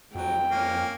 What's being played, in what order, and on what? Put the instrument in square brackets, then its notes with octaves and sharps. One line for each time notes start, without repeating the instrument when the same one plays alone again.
[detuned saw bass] F2 [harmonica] F#3 [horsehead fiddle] G5
[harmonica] A#3 C#4